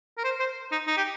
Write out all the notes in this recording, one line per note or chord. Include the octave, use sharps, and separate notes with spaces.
A#4
C5
C5
D#4
D#4
G4